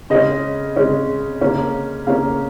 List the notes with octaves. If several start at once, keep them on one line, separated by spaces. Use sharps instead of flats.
C#3 G#3 C#4 D#5
C#3 G#3 C#4
C#3 A#3 C#4
C#3 A#3 C#4 F5